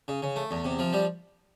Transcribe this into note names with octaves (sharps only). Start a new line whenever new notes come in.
C#3
C#3
A3
E2
C3
F3
G3